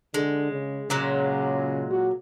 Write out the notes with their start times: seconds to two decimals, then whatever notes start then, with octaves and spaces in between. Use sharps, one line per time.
0.14 D3 G#3
0.51 C#3
0.90 A#2 C#3 F#3 G#3
1.91 F#4